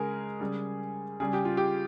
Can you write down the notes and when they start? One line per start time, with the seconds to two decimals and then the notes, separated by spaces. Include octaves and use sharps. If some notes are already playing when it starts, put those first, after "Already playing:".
Already playing: C#3 G#3 G#4 A#4
0.40 C#3 G3
1.20 C#3 G3 G#4
1.33 G4
1.45 F4
1.57 G4